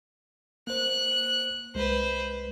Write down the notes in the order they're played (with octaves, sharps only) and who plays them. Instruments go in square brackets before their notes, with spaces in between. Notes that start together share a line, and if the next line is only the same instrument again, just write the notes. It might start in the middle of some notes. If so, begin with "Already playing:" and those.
[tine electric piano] A#3 C5 [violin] F#6
[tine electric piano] C2 G#3 [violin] B4 C5